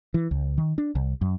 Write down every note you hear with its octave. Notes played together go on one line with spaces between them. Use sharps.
E3
C#2
D#3
D4
C2
F#2